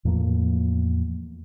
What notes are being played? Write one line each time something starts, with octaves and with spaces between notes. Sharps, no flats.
E2 A2 F3 A#3